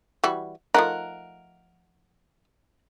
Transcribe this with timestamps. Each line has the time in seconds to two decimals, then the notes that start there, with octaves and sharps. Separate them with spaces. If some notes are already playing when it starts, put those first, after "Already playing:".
0.24 E3 G3 F#4
0.74 F3 A3 D#4 A#4 F#5